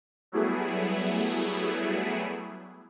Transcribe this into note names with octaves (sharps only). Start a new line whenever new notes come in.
F#3 G3 A3 B3 E4 G#4